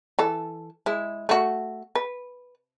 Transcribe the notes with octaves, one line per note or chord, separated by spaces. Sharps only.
E3 A4
G#3 E4
A3 F#4
B4